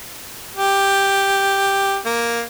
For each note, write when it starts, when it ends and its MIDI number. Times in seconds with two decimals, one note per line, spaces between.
0.56 1.98 67
2.06 2.43 58